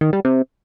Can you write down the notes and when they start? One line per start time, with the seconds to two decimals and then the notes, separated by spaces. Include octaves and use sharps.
0.01 D#3
0.13 G3
0.25 C3